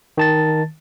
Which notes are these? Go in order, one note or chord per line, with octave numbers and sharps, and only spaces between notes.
D#3 A5 A6